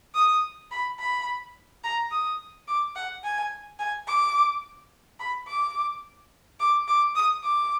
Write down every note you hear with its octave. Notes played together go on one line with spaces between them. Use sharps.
D#6
B5
B5
A#5
D#6
D6
F#5
G#5
G#5
D6
B5
D6
D6
D6
D#6
D6